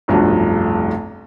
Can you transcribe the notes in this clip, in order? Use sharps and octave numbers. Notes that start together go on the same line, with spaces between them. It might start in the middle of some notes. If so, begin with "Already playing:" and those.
F1 B1 G2 F3 F#4